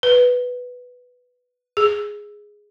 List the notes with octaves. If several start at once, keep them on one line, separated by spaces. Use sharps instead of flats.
B4
G#4